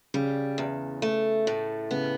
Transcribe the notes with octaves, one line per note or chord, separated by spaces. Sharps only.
C#3 G3
E2
A3
A2
C#3 B3